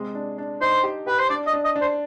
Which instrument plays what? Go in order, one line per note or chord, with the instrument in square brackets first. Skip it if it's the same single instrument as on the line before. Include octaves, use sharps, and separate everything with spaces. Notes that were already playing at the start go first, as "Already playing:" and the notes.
Already playing: [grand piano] C3 G#3
D4
D4
[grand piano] D#4 [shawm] C5
[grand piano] G4
[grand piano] G4 [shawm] B4
[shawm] C5
[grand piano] D4 [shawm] D5
[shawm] D#5
[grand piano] D4
[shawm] D#5
[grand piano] D4
[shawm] C5